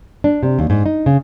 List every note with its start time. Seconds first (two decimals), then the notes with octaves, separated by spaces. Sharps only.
0.24 D4
0.43 C3
0.59 D#2
0.70 G#2
0.86 D#4
1.06 C#3